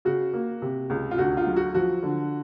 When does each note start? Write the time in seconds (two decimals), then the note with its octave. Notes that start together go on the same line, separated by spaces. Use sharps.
0.05 C#3 F#4
0.34 A#3
0.62 C3
0.90 C#2
1.11 F4
1.18 D2 F#4
1.37 F4
1.47 F#3
1.56 F#4
1.74 F3 F#4
2.03 D3